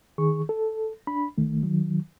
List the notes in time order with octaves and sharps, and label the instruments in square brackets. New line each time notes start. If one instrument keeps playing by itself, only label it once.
[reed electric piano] D#3 G#4 C#6
A4
D4 B5
C2 D#3 A3
D#3 F#3